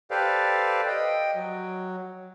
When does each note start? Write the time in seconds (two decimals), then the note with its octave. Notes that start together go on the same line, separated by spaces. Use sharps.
0.11 G4 A4 B4 C5 D5 F5
0.88 D#5 G5
1.35 F#3